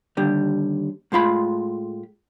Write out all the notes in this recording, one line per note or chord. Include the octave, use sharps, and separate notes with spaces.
D#2 D3 G3
A2 G#3 F4 B5